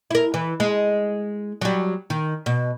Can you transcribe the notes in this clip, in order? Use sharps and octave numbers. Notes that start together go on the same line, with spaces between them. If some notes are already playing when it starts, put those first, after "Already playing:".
E4 A#4
E3
G#3
F#3 G3
D#3
B2